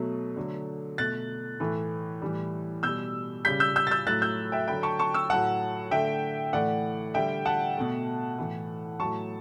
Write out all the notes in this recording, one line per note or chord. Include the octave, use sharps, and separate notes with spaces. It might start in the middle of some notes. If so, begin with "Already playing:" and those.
Already playing: B2 F#3 A3
D3 F#3 A3
B2 A3 F#6 A6
A2 E3 A3
A2 E3 G3
B2 G3 E6 G6
C#3 G3 G6 B6
E6 G6
E6 G6
A6
E6 G6
A2 F#3 A3 F#6 A6
E6 G6
E5 G5
D3 F#3 A3 G5 B5
A5 C#6
A5 C#6
C#6 E6
A2 F#3 A3 F#5 A5
D3 A3 E5 G5
A2 E3 A3 D5 F#5
D3 G3 E5 G5
F#5 A5
B2 A3
A2 E3 A3
A2 F#3 A3 A5 C#6